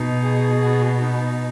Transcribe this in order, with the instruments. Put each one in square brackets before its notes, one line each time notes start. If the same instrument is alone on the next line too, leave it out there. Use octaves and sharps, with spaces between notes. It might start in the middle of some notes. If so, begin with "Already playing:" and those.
Already playing: [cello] B2 [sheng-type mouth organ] D#4
[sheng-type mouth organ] G#4
B3
D#4